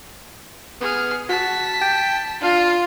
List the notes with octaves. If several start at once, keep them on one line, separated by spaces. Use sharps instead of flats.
B3 G#4 F6
F#4 A5 B6
G5
D4 F4 F5